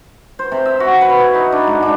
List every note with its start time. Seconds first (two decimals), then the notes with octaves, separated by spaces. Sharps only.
0.39 C5
0.52 C3
0.66 E5
0.80 F#4
1.01 B4
1.19 E4
1.35 D#4
1.52 D4
1.67 G#2
1.83 D4